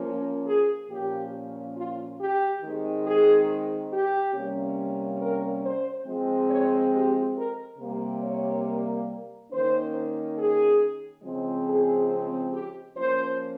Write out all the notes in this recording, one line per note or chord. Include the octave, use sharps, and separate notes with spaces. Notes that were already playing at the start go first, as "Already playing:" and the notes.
Already playing: F3 A#3 C#4
G#4
A#2 F3 A#3 C#4 G4
F4
G4
D#3 G#3 C4
G#4
G4
C3 G3 A#3 C#4
A#4
C5
F3 G#3 C4
C#5
G4
A#4
C3 G3 A#3
C#5
D#3 A#3 C#4 C5
G#4
C#3 F3 G#3 C4
G#4
G4
F3 A#3 C#4 C5